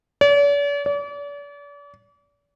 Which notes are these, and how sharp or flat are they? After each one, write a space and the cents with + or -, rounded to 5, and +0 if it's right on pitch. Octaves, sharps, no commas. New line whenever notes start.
D5 -45
D5 -40